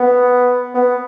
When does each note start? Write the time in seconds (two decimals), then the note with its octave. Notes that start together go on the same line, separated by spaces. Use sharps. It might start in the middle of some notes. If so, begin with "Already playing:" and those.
Already playing: B3
0.74 B3